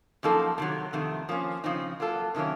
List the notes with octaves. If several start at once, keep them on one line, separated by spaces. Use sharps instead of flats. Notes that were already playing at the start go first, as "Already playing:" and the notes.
F#2 F3 A#3 D#4 A4
C3 D#3 F#3
F2 C3 D#3 A3
F3 A#3 C#4
C#3 F3 C4 D#4
F#3 A#3 F4 A4
C3 D#3 F#3 A#3 C#4